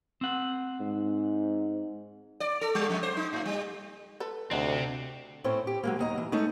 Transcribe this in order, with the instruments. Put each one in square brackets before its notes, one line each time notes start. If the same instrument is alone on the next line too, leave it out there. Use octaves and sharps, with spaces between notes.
[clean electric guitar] C4 F#5
[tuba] G#2
[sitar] D5
A4
G3
F2
C5
D#4
A2
G3
[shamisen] A4 B4
[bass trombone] D2 [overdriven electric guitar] C3 C4 [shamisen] D4 D#4 F#4
[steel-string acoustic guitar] A2 A3 C4 C#4 C5
G4
F#3 G#3 A#3
D#2 D#5 A#5
E3
G#3 A3 C#4 D#4